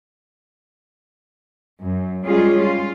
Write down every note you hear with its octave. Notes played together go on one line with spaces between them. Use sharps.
F#2
G3 G#3 C#4 F4 G#4
F4